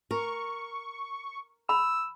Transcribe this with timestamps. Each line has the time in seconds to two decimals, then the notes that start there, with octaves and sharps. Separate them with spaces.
0.11 A#4 C#6
1.69 B5 E6